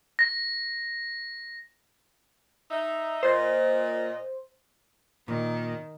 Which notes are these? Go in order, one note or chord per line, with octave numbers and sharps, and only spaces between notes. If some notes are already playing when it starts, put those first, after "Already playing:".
A#6
D#4 E5
A#2 C5 D#5
A#2 D#3